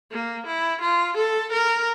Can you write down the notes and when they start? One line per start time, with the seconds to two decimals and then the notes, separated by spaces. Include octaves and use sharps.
0.11 A#3
0.47 E4
0.81 F4
1.17 A4
1.52 A#4